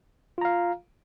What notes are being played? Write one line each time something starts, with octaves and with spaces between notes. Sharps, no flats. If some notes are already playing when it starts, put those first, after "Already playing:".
F4 F5 A#5